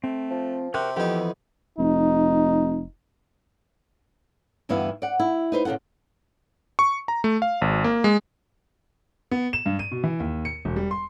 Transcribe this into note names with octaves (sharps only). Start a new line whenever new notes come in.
A3 C4
F3
C3 F#4 A#4 G5 F#6
F2 E3 B3 D#4 G4
F1 D#4
D2 G2 E3 B3 E4 F5
D5 F#5
E4
D#4 B4 C5
A#2 C#3 F4 A4 F#5
C#6
A#5
A3
F5
G#1
A#3
G#3
B3
E7
G2
D#7
B2
E3
D#2
C#7
E1
G3
C6